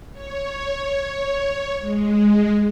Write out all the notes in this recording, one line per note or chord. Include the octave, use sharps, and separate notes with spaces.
C#5
G#3